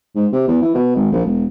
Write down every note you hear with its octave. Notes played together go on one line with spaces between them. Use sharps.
G#2
C3
E2
E3
B2
G#1
A#1
E1